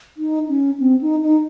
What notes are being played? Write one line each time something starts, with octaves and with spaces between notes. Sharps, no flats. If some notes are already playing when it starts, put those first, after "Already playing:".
D#4
C#4
C4
D#4
D#4